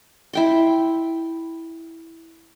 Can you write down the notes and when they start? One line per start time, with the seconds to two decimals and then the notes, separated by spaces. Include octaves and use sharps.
0.33 E4 G5 C6